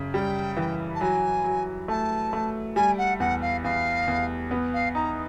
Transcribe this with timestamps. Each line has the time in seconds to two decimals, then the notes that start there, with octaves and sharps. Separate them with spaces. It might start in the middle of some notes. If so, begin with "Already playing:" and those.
Already playing: F#2 C#3
0.14 G3 G5
0.57 E3
0.95 A5
1.01 F#3 G#5
1.44 F#3
1.88 A3 A5
2.33 A3
2.76 G3 G#5
2.98 F#5
3.20 E2 F#5
3.42 F5
3.64 E2 F5
4.08 E2
4.51 B3
4.73 F5
4.95 D#4 A#5